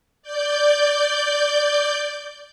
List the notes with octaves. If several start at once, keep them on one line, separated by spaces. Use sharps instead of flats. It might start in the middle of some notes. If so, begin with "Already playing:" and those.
D5 G6